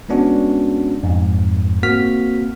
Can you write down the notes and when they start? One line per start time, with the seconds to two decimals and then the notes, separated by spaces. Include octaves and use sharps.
0.09 G#3 B3 C#4 D4 F#4
1.03 F2 G#2
1.83 A#3 C4 F#4 F6 B6